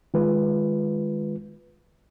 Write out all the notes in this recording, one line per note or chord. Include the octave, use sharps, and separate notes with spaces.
D#3 G#3 F4 B4